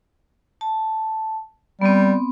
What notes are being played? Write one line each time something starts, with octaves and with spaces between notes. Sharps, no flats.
A5
G3 B3 C4